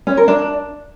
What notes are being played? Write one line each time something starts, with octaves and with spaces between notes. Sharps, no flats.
C#4
A#4
D4